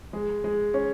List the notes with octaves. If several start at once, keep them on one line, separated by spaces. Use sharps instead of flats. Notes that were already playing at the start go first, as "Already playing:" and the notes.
G#3
G#3
C#4